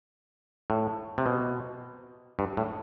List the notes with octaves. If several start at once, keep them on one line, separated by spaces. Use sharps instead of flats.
A2
C3
B2
G2
A2